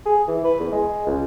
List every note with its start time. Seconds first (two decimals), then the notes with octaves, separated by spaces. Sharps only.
0.06 G#4
0.28 E3
0.45 B4
0.60 E2
0.72 G#3
1.07 C#2